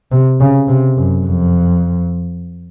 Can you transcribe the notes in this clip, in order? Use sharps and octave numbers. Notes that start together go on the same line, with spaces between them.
C3
C#3
C3
F#2
F2